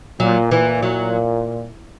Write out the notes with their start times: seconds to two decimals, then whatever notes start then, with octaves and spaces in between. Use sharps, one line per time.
0.20 A#2 F#3
0.51 A#2 E3
0.82 F#3